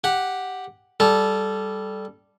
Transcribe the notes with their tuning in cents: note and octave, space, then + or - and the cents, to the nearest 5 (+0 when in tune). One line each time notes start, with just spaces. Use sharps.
G4 +0 F#5 +0
G3 +0 A4 -15